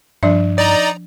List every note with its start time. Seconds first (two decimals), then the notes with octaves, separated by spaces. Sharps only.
0.23 G2 F3 D4 E5
0.58 D#4 D5 A#5